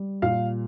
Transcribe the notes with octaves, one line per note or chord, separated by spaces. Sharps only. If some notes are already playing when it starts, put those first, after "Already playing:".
Already playing: G3
A#2 F5